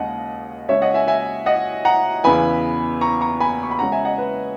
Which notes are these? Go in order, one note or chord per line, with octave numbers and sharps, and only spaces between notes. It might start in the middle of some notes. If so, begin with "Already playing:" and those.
Already playing: D#2 C#3 G#3 D#5 F#5
C#3 G#3 C#4 C#5 E5
D#5 F#5
E5 G#5
E5 G#5
D#5 F#5
F#5 A#5
E2 C#3 E3 B3 G#5 B5
A#5 C#6
A#5 C#6
G#5 B5
C#6
B5
C#3 G#3 C#4 F#5 A#5
E5 G#5
D#5 F#5
B4